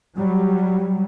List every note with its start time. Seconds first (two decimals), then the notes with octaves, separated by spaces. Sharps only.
0.17 F#3 G3